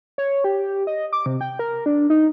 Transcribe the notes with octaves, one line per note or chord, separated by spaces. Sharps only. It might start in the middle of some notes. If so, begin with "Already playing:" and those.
C#5
G4
D#5
D6
C3
G5
A#4
D4
D#4